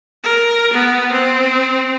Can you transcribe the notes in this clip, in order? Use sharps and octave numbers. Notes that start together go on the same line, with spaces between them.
A#4
B3
C4